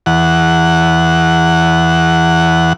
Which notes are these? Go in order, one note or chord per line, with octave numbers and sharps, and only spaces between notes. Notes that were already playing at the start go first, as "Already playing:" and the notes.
E2 F#5